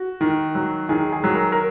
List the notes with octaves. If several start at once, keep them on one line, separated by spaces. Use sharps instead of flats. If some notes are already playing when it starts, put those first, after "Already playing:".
Already playing: F#4
D#3
F#3
D#3 G#4
G#4
F#3
A#4
A#4